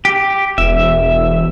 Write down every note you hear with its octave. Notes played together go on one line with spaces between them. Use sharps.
G4
E1 E5